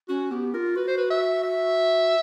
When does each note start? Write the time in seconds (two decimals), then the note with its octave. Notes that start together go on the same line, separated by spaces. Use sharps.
0.09 C#4 F#4
0.31 B3 G4
0.53 F4 A#4
0.76 F#4 B4
0.87 C5
0.98 B4
1.10 E5
1.44 E5